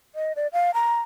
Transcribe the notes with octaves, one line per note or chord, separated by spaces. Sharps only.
D#5
D5
F5
A#5